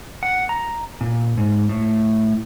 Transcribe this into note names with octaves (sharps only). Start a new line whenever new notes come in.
F#5
A#5
A#2
G#2
A2